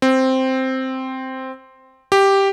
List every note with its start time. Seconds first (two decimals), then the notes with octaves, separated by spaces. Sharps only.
0.02 C4
2.12 G4